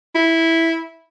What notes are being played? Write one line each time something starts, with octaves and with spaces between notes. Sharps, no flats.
E4